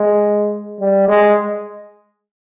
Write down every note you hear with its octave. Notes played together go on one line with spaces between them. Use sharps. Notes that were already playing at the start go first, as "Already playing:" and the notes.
Already playing: G#3
G3
G#3